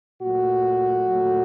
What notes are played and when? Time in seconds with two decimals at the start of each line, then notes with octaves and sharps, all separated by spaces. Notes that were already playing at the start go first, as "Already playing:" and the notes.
0.22 A#2 F#3 A3 F#4
1.08 A#2 F#3 A3